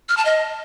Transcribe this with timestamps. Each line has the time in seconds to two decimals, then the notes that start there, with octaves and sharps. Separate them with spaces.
0.09 F6
0.17 A5
0.25 D#5